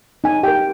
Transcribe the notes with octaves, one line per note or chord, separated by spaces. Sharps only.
D#4 G#5
G4 A#4 G5